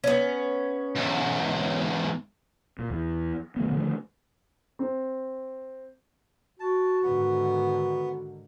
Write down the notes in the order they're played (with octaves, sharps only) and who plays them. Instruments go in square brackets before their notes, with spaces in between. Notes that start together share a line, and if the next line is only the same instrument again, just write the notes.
[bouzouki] B3 C#4
[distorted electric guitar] E2 G#2
[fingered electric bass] A#2
E2
D#3 A3 B3
D3 D#3 F3 A3
[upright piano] C4
[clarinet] F#4 [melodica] A5
[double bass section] G#2 D3 D#3 [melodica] B3